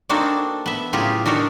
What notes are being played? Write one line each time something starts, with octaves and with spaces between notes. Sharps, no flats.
A#3 C4 D4 D#4 F#4 A4
B3 E5
A2 C#3 F#3 F4 G4 G#4
D4 D#4 F#4 A4 A#4